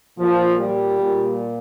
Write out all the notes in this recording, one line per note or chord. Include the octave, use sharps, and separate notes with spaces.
A#2 F3
G3
A#2